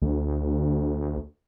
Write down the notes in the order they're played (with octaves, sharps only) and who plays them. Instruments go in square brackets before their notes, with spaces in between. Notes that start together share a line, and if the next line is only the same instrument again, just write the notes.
[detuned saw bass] D2